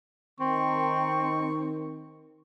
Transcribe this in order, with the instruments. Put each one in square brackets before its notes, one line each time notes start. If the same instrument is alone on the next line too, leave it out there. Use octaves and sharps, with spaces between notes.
[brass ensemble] D#3 [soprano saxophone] C4 [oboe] C#6